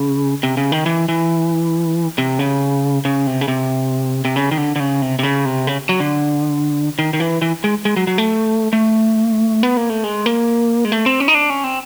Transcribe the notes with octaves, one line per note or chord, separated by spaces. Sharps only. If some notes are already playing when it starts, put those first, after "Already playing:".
Already playing: C#3
C3
C#3
D#3
E3
E3
C3
C#3
C#3
C3
C#3
C3
C3
C#3
D#3
D3
D3
C#3
C3
C3
C#3
C3
C#3
F#3
D3
D#3
D#3
E3
E3
G#3
G#3
F#3
F#3
A3
A3
B3
A#3
A3
G#3
A#3
G#3
A3
C4
C#4
D#4
D4
C#4
C4